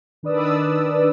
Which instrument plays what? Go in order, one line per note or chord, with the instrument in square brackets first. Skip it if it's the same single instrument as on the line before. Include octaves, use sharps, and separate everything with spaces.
[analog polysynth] D#3 D4 B4 D5 D#6 E6